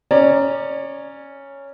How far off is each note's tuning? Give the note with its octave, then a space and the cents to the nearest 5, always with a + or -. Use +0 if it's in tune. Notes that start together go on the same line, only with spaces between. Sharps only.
C#4 +0 D5 +25 A#5 +0